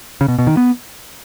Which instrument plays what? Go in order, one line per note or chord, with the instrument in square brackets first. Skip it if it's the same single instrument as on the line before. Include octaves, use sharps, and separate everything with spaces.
[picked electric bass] C#3
B2
B2
D#3
B3